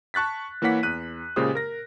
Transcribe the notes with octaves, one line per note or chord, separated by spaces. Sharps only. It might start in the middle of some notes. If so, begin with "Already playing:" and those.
A5 C#6 F#6 A6 B6
E3 A#3 E4 C#5 F#5 B6
E2 F#6 D#7
A#2 C#3 G#3 G4 C5 D#6
A#4 A#6